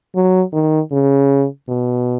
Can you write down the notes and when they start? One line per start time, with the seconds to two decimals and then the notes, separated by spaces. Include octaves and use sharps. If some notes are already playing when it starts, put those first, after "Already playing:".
0.16 F#3
0.53 D#3
0.92 C#3
1.68 B2